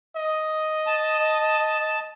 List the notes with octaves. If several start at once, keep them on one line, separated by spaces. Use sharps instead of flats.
D#5
A5